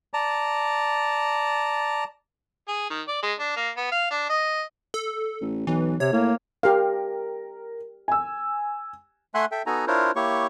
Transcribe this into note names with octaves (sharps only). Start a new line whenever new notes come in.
D5 A5 A#5
G#4
D#3
D5
G#3
D4
A#3
B3
F5
D4
D#5
A4
A1
B1 E3
C3 C#5
A2 A#3
G4 A#4 F5
G#5 E6
A3 E5 F#5 G#5 C6 F#6
A4 E5 G5
B3 D#4 F#4 A4 G#5 A#5
D4 E4 F4 A#4 C5 C#5
A#3 E4 G4 C#5 C#6